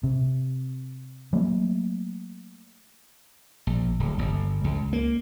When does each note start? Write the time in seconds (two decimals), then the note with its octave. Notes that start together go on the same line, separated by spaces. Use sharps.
0.03 C3
1.33 F#3 A3 A#3
3.67 A#1
4.00 D1
4.19 G1
4.64 C#2
4.93 A#3